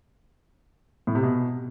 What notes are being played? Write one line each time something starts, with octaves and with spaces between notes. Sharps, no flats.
A2
C3
B2